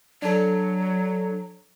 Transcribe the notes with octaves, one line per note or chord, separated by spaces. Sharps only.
F#3 D4 A4